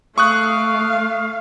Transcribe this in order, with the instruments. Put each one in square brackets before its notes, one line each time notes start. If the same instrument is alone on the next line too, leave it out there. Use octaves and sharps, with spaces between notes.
[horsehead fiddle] A3 F5 [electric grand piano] C#6 D#6 F#6